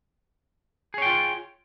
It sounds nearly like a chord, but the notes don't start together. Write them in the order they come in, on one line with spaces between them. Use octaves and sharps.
G#4 C#5 G5 F4